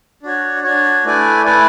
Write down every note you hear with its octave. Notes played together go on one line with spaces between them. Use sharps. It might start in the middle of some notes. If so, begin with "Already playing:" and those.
D4 F#4 C#5
D4 F#4 C#5
A3 E4 B4 D5 G#5
A3 E4 B4 D5 G#5